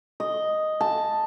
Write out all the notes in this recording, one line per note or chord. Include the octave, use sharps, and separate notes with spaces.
D#5
A5